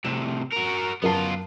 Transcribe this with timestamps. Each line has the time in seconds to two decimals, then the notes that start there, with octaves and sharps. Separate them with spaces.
0.05 A2 C3 E7
0.53 F#4 A#4
1.02 F#2 B3 F4 A#4 A5